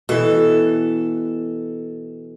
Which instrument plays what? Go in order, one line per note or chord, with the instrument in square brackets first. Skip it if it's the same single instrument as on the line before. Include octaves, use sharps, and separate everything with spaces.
[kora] B2 E3 [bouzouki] A4